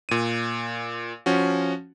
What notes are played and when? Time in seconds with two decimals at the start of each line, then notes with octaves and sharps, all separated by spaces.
0.09 A#2 D#7
1.26 F3 C#4 F#4